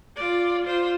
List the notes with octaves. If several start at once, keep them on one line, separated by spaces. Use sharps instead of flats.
F4 D5
F4 C5